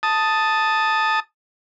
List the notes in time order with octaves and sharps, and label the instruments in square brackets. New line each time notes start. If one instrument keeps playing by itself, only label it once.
[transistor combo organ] A5 D#6